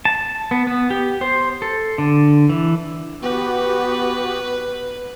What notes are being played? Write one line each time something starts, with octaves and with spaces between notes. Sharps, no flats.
A5
B3
B3
G4
C5
A4
D3
E3
B3 F#4 G4 B4